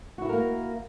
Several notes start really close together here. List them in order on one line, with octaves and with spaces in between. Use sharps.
F#4 E4 G4 A#4 A#3